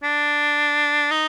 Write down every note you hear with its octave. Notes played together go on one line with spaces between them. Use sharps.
D4
D#4